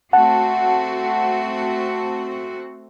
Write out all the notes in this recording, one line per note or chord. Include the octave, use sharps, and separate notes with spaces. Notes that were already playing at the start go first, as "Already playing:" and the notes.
A3 C4 F#4 F#5 A5